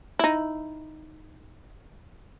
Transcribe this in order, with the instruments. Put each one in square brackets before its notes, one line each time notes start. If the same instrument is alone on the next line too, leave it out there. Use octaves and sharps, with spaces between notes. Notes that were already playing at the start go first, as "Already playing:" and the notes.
[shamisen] D#4 E4